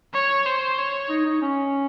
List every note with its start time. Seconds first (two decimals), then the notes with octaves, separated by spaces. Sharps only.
0.14 C#5
0.46 C5
0.78 C#5
1.09 D#4
1.26 D#4
1.42 C#4